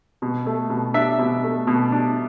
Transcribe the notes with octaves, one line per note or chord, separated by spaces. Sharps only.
B2
A3
B2
D4 E5
B2
A3
B2
D4